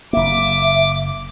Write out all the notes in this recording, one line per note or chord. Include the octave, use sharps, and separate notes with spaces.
F#1 A#3 E5 D6